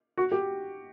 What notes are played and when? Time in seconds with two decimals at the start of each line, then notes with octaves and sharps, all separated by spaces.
0.17 F#4
0.32 G4